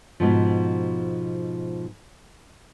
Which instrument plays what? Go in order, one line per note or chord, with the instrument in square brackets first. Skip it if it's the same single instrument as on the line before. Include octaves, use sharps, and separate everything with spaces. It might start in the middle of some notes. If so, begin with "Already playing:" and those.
[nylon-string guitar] G#2 B2 F3